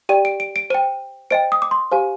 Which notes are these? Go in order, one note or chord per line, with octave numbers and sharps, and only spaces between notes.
G4 D5 G5 D#7
D7
D7
D7
C5 G5 D#7
C5 D#5 G5 D7
D#6
D6
C6
G4 C5 F5 G#5